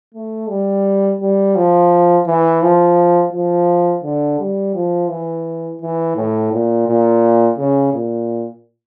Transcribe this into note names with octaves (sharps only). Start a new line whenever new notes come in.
A3
G3
G3
F3
E3
F3
F3
D3
G3
F3
E3
E3
A2
A#2
A#2
C#3
A#2